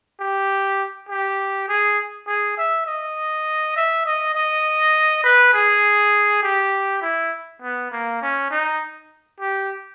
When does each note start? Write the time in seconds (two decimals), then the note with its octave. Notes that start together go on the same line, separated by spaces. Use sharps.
0.20 G4
1.09 G4
1.68 G#4
2.27 G#4
2.58 E5
2.86 D#5
3.76 E5
4.06 D#5
4.35 D#5
5.24 B4
5.53 G#4
6.42 G4
7.02 E4
7.62 B3
7.91 A#3
8.22 C#4
8.51 D#4
9.40 G4